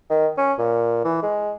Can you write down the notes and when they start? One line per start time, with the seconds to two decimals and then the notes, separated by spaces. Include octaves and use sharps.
0.10 D#3
0.38 C#4
0.59 A#2
1.05 E3
1.23 G#3